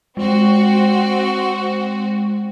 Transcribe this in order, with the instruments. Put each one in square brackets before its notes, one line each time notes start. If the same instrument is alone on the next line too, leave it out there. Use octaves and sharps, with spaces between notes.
[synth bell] G#3 [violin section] C4 F#4